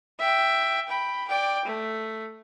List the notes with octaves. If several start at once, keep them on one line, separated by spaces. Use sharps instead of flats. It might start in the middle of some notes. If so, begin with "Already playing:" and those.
E5 G5
G5 B5
D5 G5
A3